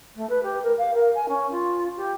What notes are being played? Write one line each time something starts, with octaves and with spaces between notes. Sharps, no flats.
A3
B4
G4
A#4
F5
A#4
G#5
C#4
F4
G4